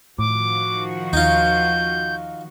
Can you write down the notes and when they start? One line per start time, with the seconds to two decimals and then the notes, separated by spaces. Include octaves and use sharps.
0.19 A2 D#3 F3 F#4 D6
1.13 D#2 D#4 F4 G6